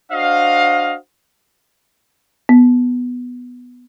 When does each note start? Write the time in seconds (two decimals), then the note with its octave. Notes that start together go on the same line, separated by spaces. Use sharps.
0.12 D4 F#4 C5 D#5 F5
2.49 B3